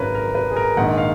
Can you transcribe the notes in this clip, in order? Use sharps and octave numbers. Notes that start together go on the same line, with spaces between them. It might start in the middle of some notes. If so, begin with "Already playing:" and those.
Already playing: G#1 F#2 C#3 A#4 B4 C#5
A#4
B4
G#4
A#4
A#1 G#2 D#3 F#5
F5